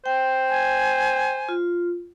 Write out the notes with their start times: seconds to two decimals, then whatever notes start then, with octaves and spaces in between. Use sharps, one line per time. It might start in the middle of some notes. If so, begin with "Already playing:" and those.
0.06 C5 G5
0.49 G#5
1.49 F4